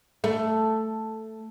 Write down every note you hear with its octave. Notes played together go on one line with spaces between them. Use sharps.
A3